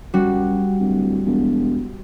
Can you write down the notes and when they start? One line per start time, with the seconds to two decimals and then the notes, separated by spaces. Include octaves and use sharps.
0.14 F#2 G3 F#4
0.80 D1
1.26 E1